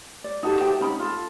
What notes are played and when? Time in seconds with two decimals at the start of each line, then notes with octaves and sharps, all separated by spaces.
0.24 D5
0.43 D#4 F#4 G4 A4
0.61 G4 C5 E5 G5
0.81 C#4 D#4 B5
0.99 F4 A4